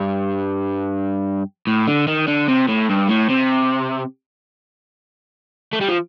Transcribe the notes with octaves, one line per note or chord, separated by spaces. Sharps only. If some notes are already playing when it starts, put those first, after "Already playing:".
Already playing: G2
A2
D3
D#3
D3
C3
A2
G2
A2
C3
A3
G3
F3